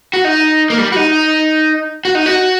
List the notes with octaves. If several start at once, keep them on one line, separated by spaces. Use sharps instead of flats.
F#4
D#4
A#3
G3
F#4
D#4
F#4
D#4
F#4